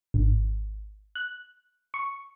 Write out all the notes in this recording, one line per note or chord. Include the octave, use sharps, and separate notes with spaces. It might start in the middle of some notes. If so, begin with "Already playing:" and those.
G#1
F#6
C#6